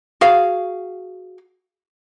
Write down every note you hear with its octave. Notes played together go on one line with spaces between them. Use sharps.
F#4 G#4 F5